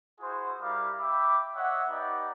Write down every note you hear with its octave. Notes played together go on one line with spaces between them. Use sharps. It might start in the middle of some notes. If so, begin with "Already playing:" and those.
E4 F#4 G#4 C5
G3 E4 A#4 F5 D6
E5 G5 B5 D6
C#5 D#5 E5 F#5
B3 D#4 G4 D5 F#5